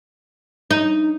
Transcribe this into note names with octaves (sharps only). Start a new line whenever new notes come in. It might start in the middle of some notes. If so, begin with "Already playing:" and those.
D#4